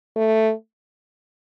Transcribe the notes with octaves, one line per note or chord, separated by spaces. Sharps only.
A3